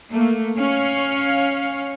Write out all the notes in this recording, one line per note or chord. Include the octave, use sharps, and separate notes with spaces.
A3 A#3
C#4 C#5 F5